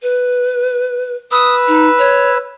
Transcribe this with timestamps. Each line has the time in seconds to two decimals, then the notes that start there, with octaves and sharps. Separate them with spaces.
0.02 B4
1.32 B4 D#6 E6
1.68 D#4
1.99 C#5